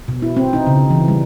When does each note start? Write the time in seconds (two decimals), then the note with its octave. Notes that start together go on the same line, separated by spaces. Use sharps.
0.08 B2
0.22 E4
0.37 C4
0.53 D#4
0.67 C#3
0.90 E3
1.08 G3